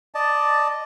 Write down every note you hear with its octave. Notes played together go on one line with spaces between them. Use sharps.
D5 D#5 A5